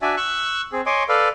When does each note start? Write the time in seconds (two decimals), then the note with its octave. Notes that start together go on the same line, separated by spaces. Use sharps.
0.02 D4 F#4 D5 E5 G#5
0.17 C#6 E6 F#6
0.72 C4 G#4
0.86 C#5 D#5 G#5 C6 D6
1.09 A4 B4 D5 F5